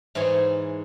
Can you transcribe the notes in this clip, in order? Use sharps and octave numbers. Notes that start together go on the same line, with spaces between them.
G#2 E3 C#5 G#5